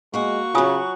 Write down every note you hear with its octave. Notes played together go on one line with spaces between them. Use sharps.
G#3 A#3 F#4 C#6
C#3 F#3 F4 F#4 G#5 D#6